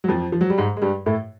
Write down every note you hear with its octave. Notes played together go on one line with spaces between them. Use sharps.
F#3
F2 F3
F3
F#3
G3
G#2 G#3
G#3
G2 G3
A2 A3